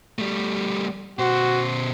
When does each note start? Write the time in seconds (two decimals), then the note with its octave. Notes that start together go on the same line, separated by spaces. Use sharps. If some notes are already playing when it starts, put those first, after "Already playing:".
0.19 G3 A3
1.19 B2 F#4 C5